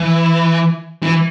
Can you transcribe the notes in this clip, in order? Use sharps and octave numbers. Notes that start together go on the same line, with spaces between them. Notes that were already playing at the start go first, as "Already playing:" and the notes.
Already playing: E3
E3